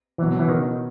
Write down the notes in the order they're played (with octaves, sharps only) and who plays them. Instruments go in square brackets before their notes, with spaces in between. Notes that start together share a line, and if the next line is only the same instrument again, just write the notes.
[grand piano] B2 F#3 B3 F#4 C#5 [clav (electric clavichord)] E3
[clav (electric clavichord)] E3
D#3